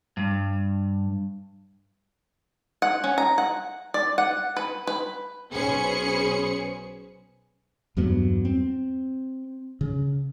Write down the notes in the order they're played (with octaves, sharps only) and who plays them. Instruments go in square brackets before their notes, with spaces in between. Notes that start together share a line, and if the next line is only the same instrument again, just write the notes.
[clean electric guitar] G2
[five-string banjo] F#5
C#4
A#5
F#5
D5
F#5
B4
B4
[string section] B1 C#4 G#4 B4 C5 C#7
[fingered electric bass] E2 G2 F#3 B3
C4
C#3